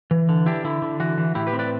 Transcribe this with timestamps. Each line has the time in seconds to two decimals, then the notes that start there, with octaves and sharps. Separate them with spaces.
0.11 E3
0.29 D3
0.46 D4 E4 G4
0.64 D3 E4
0.82 D3
1.00 E3 F#4
1.18 E3
1.35 A2 E4 G4
1.47 G4 B4
1.53 C4
1.59 B4 D5